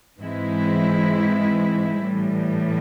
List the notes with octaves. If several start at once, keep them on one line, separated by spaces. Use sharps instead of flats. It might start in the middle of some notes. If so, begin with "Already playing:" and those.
G#2 E3 G#3 C4 E4
A2 E3 G3